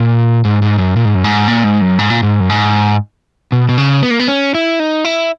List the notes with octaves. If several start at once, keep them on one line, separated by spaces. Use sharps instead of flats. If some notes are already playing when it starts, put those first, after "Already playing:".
Already playing: A#2
G#2
G#2
F#2
A#2
G#2
F#2
G#2
A#2
G#2
F#2
G#2
A#2
G#2
F#2
G#2
B2
B2
C#3
B3
A#3
B3
C#4
E4
D#4
E4